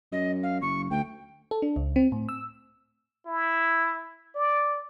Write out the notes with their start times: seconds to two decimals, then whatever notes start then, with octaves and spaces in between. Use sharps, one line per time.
0.12 F#2 D#5
0.43 F5
0.62 F#1 C#6
0.91 D2 G5
1.51 A4
1.62 D4
1.76 C#2
1.96 C4
2.12 A2
2.29 E6
3.26 E4
4.35 D5